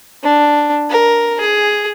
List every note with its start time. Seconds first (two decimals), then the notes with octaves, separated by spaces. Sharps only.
0.23 D4
0.90 A#4
1.40 G#4